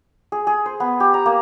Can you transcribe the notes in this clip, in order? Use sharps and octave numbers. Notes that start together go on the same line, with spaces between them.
G#4
G#4
C5
B3
G4
A#5
A#3